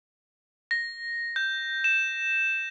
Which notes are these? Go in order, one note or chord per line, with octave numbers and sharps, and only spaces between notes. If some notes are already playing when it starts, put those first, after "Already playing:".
A#6
G6
E7